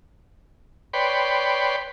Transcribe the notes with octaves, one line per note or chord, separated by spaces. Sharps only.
B4 C#5 D5 G5 B5 C6